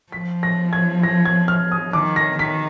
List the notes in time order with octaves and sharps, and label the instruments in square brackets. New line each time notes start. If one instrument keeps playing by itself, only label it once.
[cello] F3 [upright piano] B6
[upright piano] A#6
G#6
A#6
G#6
F6
D#6
[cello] D#3 [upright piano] D6
[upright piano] A#6
[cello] D#3 [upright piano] B6